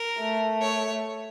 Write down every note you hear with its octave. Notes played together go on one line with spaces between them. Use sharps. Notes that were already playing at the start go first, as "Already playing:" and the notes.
Already playing: A#4
A3
C#5